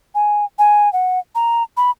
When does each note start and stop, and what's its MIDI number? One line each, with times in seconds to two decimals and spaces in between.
0.15 0.45 80
0.59 0.91 80
0.93 1.19 78
1.35 1.63 82
1.77 1.91 83